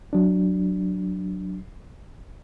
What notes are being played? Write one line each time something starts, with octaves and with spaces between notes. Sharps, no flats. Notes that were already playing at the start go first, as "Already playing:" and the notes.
F#3 D4